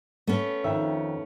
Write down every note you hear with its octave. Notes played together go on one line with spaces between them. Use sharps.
A3 B3 C#4
F2 D#3 E5